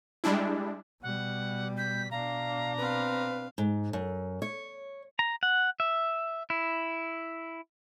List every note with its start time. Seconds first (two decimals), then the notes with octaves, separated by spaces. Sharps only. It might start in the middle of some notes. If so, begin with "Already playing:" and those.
0.24 G3 G#3 D4 E4
1.03 B2 G3 F#5
1.77 G6 B6
2.11 B2 D4 F5 A#5
2.77 C4 B4 F5
3.58 G#2
3.93 F#2
4.42 C#5
5.19 A#5
5.43 F#5
5.80 E5
6.50 E4